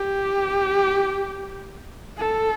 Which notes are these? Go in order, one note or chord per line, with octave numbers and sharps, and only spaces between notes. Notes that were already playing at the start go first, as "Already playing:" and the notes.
Already playing: G4
A4